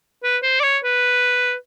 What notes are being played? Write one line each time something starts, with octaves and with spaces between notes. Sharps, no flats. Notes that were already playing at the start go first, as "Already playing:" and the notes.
B4
C5
D5
C#5
B4